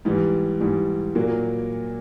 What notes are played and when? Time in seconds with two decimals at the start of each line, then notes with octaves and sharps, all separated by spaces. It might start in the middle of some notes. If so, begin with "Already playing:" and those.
0.05 G#2 E3 G3
0.60 G#2 E3 G3
1.15 A#2 F#3 A#3